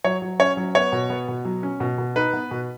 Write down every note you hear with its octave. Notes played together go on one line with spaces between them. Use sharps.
F#3 C#5
F#3
C#4 C#5
F#3
B3 C#5
B2
B3
B2
F#3
C#4
B2
B2
D#4 B4
B3
B2